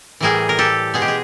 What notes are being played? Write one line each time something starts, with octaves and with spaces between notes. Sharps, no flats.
A2 E3 G3 G#4 A#4
A#4
G4 A4
B2 G#3 G#4
G4
G#4